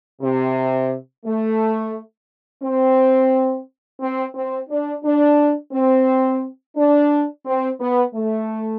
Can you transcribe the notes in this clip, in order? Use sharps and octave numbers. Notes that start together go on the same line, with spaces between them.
C3
A3
C4
C4
C4
D4
D4
C4
D4
C4
B3
A3